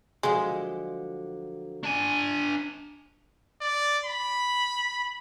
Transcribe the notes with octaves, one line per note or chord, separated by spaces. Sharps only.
D3 F3 F#3 G#3
D4 G#5
D5
B5